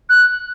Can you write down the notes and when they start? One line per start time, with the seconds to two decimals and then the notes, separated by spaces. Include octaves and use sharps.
0.09 F#6